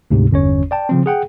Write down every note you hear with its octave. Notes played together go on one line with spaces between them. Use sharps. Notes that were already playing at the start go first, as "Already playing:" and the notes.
D2 G#2 C3
G1 E2 C#4 C#5
D5 G5 A5
C#3 F3 C4
G#4 F#5 G5